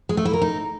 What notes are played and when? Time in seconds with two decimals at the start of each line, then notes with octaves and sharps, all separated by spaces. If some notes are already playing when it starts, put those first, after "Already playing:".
0.09 G#3
0.17 A3
0.25 E4
0.33 A#4
0.42 D#4